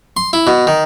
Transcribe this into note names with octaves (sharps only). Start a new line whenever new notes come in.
C6
E4
B2
D#3